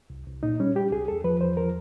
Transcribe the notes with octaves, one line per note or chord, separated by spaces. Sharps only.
C2
C2
A#2 D#4
G3 C#4
G3 G4
C2 G#4
E2 A4
F3 B4
E2 C5
F3 A#4